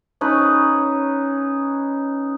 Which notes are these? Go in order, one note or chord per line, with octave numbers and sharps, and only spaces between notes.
C#4 D#4 G#4 B4